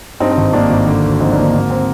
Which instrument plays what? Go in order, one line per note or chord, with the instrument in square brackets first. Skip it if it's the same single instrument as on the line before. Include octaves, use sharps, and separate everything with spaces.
[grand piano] G2 C4 D#4
C4
G#1
D#3 A#3 D4
G#1
D3
D2
F3 C4 D#4
A#3 D4
D2
A#3 D4
G#2 A#3
C4